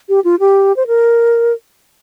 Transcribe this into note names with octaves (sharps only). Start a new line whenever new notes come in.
G4
F4
G4
C5
A#4